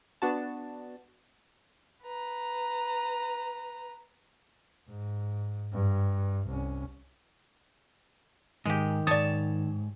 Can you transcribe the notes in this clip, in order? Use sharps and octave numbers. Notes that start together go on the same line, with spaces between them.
B3 D4 F#4 A5
B4 A#5
G#2
G2
C2 C#4
G#2 D#3 G#3 G4
F2 G#2 C#5 D5 A5 D#6